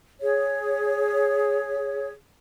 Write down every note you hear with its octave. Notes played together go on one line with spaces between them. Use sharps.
G#4 C#5